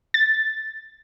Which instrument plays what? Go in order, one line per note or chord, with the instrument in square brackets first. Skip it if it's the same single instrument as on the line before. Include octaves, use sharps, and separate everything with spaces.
[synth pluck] A6